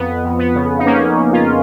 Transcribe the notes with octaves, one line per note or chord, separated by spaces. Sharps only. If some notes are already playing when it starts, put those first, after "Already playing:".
Already playing: F2 B3
F2
B3
C#3
D#4
F2 A#3 C#4
C#3
C#4 F4